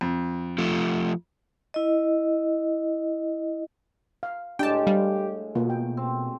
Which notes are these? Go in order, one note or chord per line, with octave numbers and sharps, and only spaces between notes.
F2
F3 A3
E4 D#5
F5
A2 G#3 D4 G4 G5 A5
G3 F5
B2 A#3 F4
G5
C4